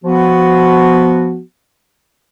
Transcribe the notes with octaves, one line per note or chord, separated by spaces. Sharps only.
F3 B3 F#4